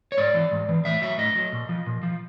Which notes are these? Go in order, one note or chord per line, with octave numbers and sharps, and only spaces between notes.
C#5
G#2 D5
E3
G#2
E3
A2 E5
F#3 E5
A2 D#5
F#3
A#2
F3
A#2
F3